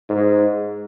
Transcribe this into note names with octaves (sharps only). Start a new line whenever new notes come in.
G#2